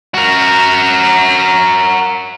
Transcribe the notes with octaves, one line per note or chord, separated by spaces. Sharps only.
F#4 A#4